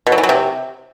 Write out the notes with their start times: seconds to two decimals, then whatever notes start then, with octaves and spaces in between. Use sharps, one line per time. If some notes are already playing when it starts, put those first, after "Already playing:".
0.07 B2
0.12 F#3
0.18 E3
0.23 F#3
0.29 C3